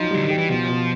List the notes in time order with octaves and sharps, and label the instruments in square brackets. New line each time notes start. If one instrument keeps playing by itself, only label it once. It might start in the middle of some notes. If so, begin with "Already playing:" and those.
Already playing: [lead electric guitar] F3 [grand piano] F#3 D#4
[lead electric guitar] D3 [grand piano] G3
[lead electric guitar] D#3 [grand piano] G4
[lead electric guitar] E3
[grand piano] B2 [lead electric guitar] F3
[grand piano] B2